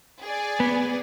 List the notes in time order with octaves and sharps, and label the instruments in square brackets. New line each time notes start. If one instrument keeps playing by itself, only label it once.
[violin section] G#4 D5
[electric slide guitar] B3